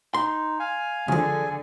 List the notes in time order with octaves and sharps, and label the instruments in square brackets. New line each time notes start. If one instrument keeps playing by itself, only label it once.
[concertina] D#4 [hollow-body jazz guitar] C6
[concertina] F5 G#5
[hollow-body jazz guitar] C#2 F3 [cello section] D3 [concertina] G#4 G#5